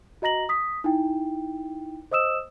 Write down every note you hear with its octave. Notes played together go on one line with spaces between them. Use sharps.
F#4 D#5 A#5 A#6 F#7
D#6 B6
D#4 E4 G5
C5 D#5 D#6 E6 E7